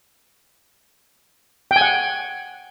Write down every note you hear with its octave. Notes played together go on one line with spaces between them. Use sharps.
G5
G#5
F#5